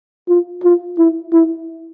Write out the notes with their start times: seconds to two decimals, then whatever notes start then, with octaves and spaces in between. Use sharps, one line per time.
0.28 F4
0.64 F4
0.98 E4
1.33 E4